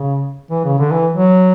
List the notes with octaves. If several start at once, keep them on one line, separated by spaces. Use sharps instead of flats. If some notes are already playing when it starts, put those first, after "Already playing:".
Already playing: C#3
E3
C#3
D3
E3
F#3